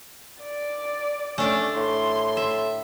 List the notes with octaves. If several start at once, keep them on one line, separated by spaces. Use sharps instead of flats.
D5
A3 C#4 D4
A2 C6
E5